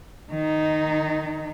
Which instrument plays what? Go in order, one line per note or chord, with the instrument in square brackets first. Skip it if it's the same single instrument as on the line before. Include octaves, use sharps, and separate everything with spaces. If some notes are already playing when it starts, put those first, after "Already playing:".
[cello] D#3 D#4